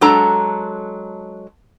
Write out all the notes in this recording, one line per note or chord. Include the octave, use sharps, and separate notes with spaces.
F#3 G#3 D4 A4 A#5